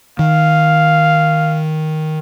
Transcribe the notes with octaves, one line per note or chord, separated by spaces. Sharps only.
D#3 F5